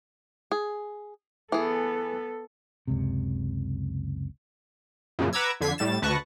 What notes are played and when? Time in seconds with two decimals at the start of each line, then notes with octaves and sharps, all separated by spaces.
0.52 G#4
1.52 E3 B3 G#4 A4
2.88 F#1 C#2 C3
5.19 F#2 A#2 C#3
5.33 B4 F#5 A#5 D6 E6 G#6
5.61 F2 D3 G#6 B6 C7
5.78 A2 G3 A6 E7
6.02 D2 B4 A5 C#6 F#6 A#6